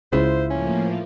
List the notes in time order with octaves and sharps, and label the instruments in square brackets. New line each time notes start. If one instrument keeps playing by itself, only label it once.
[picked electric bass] C#2 C#3 [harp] E4 F4 [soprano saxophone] C5
[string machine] A2 F3 A#3 [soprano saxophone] C#4